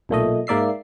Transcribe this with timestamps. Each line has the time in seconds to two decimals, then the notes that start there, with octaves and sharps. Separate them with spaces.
0.09 B1 A#2 A3 D#5
0.47 G#2 A#3 D5 E5 C7